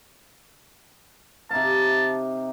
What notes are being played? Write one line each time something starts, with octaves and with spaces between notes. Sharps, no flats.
C3 D#4 F5 A5